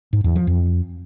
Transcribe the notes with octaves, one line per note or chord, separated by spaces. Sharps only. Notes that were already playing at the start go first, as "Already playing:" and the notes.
G#2
E2
F3
F2